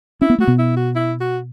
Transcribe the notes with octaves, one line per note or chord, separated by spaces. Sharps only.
C#4 E4
B3
A3 F#4
B2 B3
E4
F#4
E4
F#4